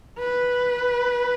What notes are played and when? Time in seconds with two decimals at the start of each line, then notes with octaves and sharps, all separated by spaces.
0.19 B4